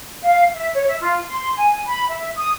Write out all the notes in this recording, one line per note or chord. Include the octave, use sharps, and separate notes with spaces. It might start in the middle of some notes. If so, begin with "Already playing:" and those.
F5
E5
C#5
E5
F4
C6
G#5
B5
E5
D#6